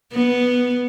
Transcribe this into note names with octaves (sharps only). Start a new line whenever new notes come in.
B3